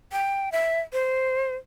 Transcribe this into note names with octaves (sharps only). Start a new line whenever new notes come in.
G5
E5
C5